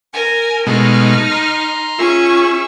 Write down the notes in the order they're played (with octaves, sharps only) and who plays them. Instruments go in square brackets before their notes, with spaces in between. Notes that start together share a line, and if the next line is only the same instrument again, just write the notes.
[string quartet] A#4 G#5
[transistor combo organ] B2 G#3 A3 [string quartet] D#4 F6
[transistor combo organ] A#5 C6
[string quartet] C#4 G#4 C#6 [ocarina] F4 [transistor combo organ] E5